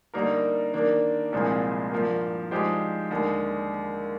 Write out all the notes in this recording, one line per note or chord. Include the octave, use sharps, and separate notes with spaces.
D3 G3 A#3 D#4 A#4
D#3 A#3 D4
C2 A#2 F3 G#3 C4
G2 F3 A#3
F3 G#3 D#4 G4 C5
D#2 D3 G#3